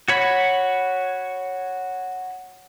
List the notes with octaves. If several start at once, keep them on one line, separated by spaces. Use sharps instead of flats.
F#4 C#5 B5